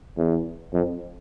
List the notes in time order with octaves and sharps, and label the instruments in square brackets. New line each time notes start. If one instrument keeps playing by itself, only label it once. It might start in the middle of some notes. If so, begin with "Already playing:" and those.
[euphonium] E2
F2